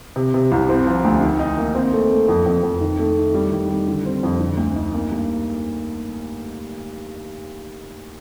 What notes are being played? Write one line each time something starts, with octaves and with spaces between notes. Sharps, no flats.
C3
C3
C2
C4
F3
D2
D#3
D#4
A#3
C4
A3
A3
F2
F2
F2
D#3
A3
D#3
G3
D#3
G3
D3
C4
F2
D3
D2
D#4
A#3
G2